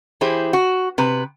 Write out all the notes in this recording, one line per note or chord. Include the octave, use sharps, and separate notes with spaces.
E3 E4 G4 G#4 C5
F#4
C3 B4